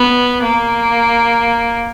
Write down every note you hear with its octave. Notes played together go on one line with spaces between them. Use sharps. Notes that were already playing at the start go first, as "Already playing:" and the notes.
Already playing: B3
A#3